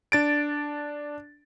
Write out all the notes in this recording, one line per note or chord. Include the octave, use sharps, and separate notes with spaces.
D4 A6 D7